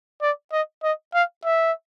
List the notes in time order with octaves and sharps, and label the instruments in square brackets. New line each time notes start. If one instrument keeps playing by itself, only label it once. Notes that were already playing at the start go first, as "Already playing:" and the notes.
[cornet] D5
D#5
D#5
F5
E5